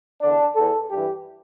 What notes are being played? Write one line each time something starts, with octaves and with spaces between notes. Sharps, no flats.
E2 D3 D4
E2 E3 A4
G2 E3 G4